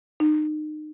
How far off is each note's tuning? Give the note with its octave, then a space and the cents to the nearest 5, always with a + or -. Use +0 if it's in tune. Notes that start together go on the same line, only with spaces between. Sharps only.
D#4 -30